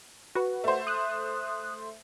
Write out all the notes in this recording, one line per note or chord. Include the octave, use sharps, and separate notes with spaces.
F#4 B4
A3 C5
D#6 F#6